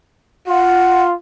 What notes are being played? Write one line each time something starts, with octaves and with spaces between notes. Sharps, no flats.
F4 F#5